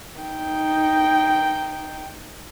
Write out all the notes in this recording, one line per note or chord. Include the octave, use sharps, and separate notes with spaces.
D#4 G5